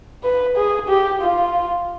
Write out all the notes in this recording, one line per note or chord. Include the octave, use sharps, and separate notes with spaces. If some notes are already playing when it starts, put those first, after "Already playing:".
B4
G#4
G4
F4